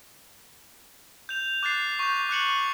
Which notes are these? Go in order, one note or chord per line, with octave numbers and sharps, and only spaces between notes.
G6 F7
D6 F#6 A6 C7
C#6 G6
D6 F#6 C#7 F#7